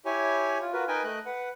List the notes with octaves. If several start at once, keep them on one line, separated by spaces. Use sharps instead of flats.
E4 G4 C#5 G#5
F4
F4 F#4 A#4 B4
D#4 A#4 B4 D#5 G5 G#5
A3 D#5 F#6
B4 F#5